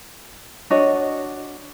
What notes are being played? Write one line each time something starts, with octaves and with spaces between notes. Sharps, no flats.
D4 F#4 C#5 D#5